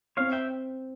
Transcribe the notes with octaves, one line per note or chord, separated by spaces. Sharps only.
C4 C#5 F5
E5 G5